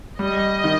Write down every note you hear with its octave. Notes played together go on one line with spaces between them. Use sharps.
G3 D#5
D#3